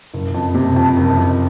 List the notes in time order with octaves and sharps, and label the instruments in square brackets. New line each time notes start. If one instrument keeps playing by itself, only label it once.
[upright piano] F#1
F2
C3
F2
F#1
F2